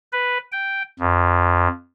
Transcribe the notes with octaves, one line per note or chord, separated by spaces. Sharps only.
B4
G5
F2